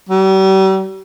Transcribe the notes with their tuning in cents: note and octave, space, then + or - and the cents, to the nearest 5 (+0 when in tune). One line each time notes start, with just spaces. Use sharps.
G3 -40